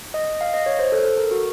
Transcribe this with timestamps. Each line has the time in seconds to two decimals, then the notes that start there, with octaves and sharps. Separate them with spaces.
0.14 D#5
0.41 F5
0.54 D#5
0.66 C#5
0.79 C5
0.92 A4
1.05 A4
1.18 A#4
1.31 F#4